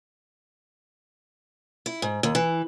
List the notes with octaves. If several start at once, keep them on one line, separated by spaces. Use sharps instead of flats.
E4
G#2
D#2
E3